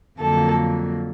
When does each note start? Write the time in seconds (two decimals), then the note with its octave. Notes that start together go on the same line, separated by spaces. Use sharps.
0.18 F2 D3 F#3 A#3 A4